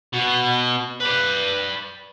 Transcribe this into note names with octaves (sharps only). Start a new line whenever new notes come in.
B2 F#4
B4 D5